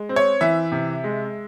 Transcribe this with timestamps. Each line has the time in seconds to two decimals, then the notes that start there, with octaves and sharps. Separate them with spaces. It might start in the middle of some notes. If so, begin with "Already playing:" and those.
Already playing: G#3
0.09 C4
0.16 C#5
0.41 E3 E5
0.72 C3
1.04 G#3